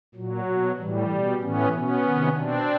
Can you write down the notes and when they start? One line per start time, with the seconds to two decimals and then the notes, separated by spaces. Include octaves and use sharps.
0.15 A#2 F#3
0.46 B2
0.77 A2 E3 G3
1.09 B2
1.40 A2 E3 B3 C#4
1.72 B2 B3 C#4
2.04 C3 D#3
2.34 B2 C4 D4